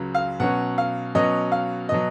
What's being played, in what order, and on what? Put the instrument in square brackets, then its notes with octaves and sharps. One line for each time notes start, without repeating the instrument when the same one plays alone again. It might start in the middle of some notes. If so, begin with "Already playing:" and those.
Already playing: [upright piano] C#2 C#3 F#3
F5
B2 F#3 C#4 F#5
F5
B2 F#3 C#4 D#5
F5
B2 F#3 D#5